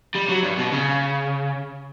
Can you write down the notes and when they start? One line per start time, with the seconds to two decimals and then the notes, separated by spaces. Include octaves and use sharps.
0.15 G3
0.29 F#3
0.44 G2
0.58 B2
0.72 C#3